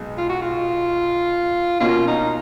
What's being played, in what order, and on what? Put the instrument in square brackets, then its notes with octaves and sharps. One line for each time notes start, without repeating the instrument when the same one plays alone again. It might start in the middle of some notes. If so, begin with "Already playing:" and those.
Already playing: [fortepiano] B1 B2 G#3
[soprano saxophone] F4
F#4
F4
[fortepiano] B2 A#3 C#4 F#4 [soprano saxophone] F4
[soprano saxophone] D#4